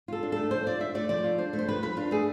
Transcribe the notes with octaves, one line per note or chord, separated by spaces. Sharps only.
F4 A4
D4
A3 A4
F3 C5
F4 D5
D4 E5
A3 D5
F3 D5
F4
D4 C5
A3
C5
F3 B4
F4 B4
D4 F4
A3 G#4